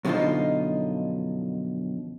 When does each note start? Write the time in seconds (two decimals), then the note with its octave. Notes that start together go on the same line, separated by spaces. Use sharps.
0.05 F#2 B2 D3 F3 D#4 F4